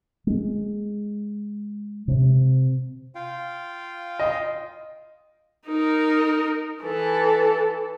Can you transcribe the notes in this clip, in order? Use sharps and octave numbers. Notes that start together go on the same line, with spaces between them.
G#3
C3
F4 F5 G5
D#5
D#4 A#4
E3 A4